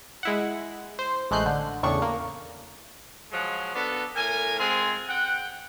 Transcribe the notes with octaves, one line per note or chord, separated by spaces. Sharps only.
G#3 E4 F#5
C5
A1 G#3 A3 F#6 G6 C7
D3
E2 A2 C#3 D4 C#6
A#3
F3 F#3 G#3
B3 D4 F#4 A4
A2 A#4 G#5
G#3 C4 F4 G#5
F#5 G5